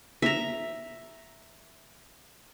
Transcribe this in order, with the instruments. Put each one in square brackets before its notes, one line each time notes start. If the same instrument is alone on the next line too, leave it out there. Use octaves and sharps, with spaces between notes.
[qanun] E5 A#5